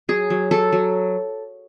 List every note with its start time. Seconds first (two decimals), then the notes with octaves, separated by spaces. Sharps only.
0.09 F#3 G#4
0.30 F#3
0.51 F#3 A4
0.72 F#3